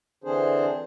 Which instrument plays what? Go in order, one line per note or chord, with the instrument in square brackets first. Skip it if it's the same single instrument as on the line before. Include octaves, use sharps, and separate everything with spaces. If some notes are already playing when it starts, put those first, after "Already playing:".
[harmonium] D3 E3 C4 D4 G#4 C5